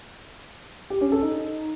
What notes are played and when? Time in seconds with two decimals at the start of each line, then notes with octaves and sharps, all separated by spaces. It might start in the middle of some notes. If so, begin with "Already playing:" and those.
0.90 G4
1.01 C#4
1.12 A4
1.23 D#4